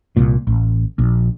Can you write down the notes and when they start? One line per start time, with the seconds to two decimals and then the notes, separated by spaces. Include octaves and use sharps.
0.17 C2 A#2
0.47 A1
0.98 A#1